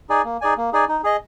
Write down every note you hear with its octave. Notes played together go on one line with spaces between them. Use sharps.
D#4 G#4 D5 G#5
A#3
D#4 G#4 D5 G#5
A#3
D#4 G#4 D5 G#5
D#4
G#4 D#5